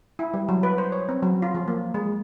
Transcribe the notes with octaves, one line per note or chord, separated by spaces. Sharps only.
E4
G3
F#3
B4
C5
C#5
C4
F#3
F4
F3
A#3
G#3